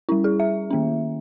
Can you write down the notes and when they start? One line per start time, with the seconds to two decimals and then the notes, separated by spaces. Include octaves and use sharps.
0.09 G3 C#4 E4
0.24 G#4
0.40 E5
0.71 D#3 A#3 C#4